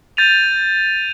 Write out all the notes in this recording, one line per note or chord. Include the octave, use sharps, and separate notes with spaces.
G6 A6 D#7 F7